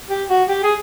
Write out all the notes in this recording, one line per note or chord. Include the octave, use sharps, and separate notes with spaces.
G4
F#4
G4
G#4